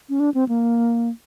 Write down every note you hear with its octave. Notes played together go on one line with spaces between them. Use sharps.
C#4
D4
C4
A#3